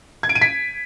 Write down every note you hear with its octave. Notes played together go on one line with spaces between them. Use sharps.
G#6
D7
D#7
B6